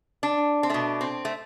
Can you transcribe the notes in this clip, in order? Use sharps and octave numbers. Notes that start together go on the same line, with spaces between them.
D4
C4
B2 A3 D4
C4
A3